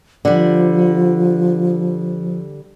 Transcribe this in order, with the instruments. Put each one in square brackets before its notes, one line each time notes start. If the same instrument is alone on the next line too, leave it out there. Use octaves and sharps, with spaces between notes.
[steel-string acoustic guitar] D3 G3 [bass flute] F3